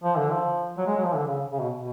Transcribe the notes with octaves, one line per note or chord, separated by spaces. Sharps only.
F3
D3
F3
F#3
G#3
F#3
F3
D3
C#3
C#3
B2
B2